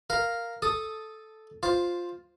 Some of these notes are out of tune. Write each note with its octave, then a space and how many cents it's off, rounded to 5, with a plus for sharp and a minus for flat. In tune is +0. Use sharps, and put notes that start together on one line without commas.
A#4 +0 F5 +0
A4 -5 D#6 +0
F4 +10 C5 +0